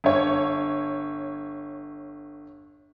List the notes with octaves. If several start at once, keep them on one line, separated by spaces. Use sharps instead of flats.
G1 C#5